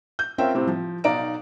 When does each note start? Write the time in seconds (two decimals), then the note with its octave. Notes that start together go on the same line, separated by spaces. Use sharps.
0.19 G6
0.38 C4 C#4 F4 A#4 E5 G5
0.54 A2 C3 C4
0.67 F3
1.04 B1 D#4 D5 F5 A#5 D7